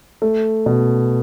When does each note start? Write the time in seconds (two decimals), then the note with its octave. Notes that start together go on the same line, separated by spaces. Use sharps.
0.22 A3
0.66 B2